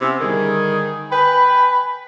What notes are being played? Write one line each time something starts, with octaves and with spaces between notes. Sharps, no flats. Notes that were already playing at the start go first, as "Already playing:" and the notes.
C3 B3 C#4 E4
D3 D#3 G3 G#4
B4 G5 G#5 B5